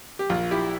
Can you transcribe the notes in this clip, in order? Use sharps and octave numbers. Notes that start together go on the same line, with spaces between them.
G4
A#1 F4
E4 G4